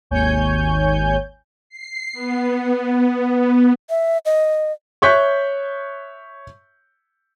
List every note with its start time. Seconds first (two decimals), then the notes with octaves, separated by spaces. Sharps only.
0.10 G#1 D#2 C#5 G#5 G6
1.69 C7
2.13 B3
3.90 E5
4.26 D#5
5.02 C#5 E5 C#6 F#6 G6 B6